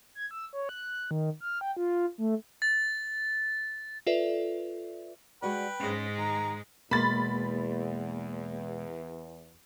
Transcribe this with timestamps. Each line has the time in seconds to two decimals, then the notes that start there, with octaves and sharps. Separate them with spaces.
0.15 G#6
0.31 E6
0.53 C#5
0.69 F#6
1.11 D#3
1.41 F6
1.61 G5
1.77 F4
2.18 A3
2.62 A6
4.07 F4 A4 B4 D5 E5
5.42 G#3 F#4 B4 D5 G5
5.79 G#2 G#3 C#4 C5
6.18 D#3 A#5
6.91 E2 B2 G#3 A#3 B5 C6 A6